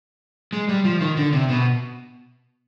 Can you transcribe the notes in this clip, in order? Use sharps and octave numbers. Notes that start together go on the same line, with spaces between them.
G#3
G3
F3
D#3
D3
C3
B2